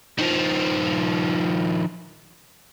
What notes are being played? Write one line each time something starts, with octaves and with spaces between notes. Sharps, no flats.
D#3 F3